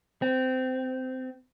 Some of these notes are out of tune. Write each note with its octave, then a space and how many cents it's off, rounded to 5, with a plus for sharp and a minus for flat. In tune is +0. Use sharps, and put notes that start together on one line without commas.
C4 -20